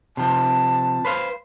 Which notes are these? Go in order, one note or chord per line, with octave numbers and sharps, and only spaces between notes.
C3 F3 A5
B4 C5 F5